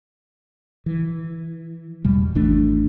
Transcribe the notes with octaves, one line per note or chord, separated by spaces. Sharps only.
E3
E2 B2 G3
G#1 E3 A3 D4